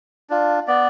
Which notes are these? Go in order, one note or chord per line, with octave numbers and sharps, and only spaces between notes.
D4 F4
B3 D5